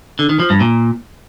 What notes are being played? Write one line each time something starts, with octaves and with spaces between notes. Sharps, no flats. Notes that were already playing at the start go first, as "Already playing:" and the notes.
D3
D#3
F3
G2
A#2